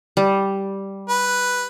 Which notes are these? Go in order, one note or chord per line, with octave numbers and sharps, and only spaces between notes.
G3
B4